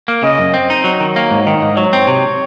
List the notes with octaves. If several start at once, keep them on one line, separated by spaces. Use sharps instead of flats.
A#3
C#3 D#5
F#2
C4
D#4
F#3
D#3
A#3 C#5
G#2
D#3 D#5
G#2
F#3 C#5
C4
C3